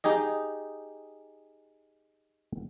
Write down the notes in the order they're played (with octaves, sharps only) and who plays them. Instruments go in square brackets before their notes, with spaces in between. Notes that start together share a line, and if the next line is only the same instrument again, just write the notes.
[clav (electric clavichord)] D#4 G4 G#4 D#5